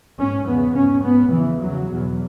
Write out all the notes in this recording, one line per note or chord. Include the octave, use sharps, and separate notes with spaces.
G#2 C#4
E2 C#3 B3
G#2 C#4
G#2 B3
E2 C#3 E3
E2 C#3 F#3
E2 B2